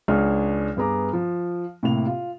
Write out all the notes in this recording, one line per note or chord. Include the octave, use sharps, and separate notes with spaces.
C#2 D4 G#4 C#5 F6
G2 B3 G#4 A#5 D6
F3
A2 C3 A#3 F7
F4